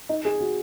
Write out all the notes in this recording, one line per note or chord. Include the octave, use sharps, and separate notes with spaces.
D#4
G#4
F#4